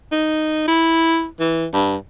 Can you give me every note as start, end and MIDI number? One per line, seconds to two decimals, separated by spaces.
0.12 0.65 63
0.67 1.26 64
1.40 1.66 52
1.73 1.96 43